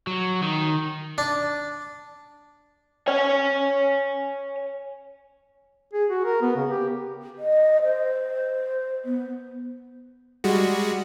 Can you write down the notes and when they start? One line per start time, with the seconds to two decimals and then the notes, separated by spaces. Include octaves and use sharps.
0.07 F#3
0.42 D#3
1.18 D4
3.08 C#5 G#5
5.94 G#4
6.10 F#4
6.25 A#4
6.42 B3
6.56 C#3
6.70 G4
7.38 D#5
7.83 C5
9.05 B3
10.44 G3 G#3 F#4